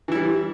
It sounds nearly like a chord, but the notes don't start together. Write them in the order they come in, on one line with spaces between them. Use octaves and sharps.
E3 E4 G3